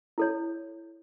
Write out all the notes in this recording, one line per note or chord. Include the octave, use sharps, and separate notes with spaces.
E4 A4 C#5